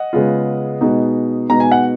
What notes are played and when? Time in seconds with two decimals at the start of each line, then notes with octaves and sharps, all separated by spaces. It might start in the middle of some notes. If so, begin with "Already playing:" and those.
Already playing: D#5 F#5
0.13 C#3 G#3 B3 F4
0.80 B2 G#3 B3 D#4
1.49 B2 G#3 B3 D#4 A#5
1.60 G#5
1.72 F#5